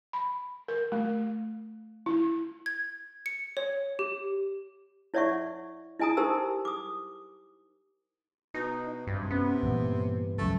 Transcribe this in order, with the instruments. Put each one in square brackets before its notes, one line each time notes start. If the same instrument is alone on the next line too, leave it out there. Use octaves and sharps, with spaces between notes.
[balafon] B5
A#4
A3
E4
[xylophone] G#6
C#7
C#5
G4
[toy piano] E4 C#5 D5 E5 F#5 C#6
E4 D#5 G#5 A#5 D#6
D#4 G4 A#4 C5 A#5 E6
D6 D#6
[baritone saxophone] B2 [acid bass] D#4
[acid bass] G2 [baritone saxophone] C3
[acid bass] B3 [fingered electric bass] C#4
[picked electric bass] G2 E3 [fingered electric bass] A#2
[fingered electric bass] G#1 C#2 F#2 [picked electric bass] C#3 F#3 [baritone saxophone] A3